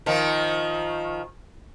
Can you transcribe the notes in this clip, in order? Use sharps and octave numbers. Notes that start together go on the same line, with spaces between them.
D#3 F3